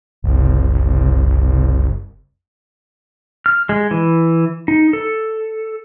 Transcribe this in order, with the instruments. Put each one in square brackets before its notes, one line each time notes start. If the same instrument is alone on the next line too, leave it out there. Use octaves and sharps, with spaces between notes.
[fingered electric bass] F#1 [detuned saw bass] C2
[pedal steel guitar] F6
G#3
E3
D#4
A4